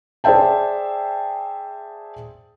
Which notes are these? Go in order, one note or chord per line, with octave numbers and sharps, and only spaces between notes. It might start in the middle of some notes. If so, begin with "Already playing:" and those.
G#4 C5 D5 E5 G5 A5